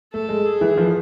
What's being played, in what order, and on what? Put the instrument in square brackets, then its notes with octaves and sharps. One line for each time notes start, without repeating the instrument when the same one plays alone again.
[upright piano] A3 [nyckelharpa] A4
[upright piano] G#3
[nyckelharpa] G#4
[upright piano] E3
F3